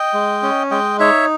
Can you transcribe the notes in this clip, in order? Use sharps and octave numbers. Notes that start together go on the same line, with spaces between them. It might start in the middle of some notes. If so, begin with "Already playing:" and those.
Already playing: D#5 G5
G#3
C#4
G#3 D#5 G5
D#4 C#5 E5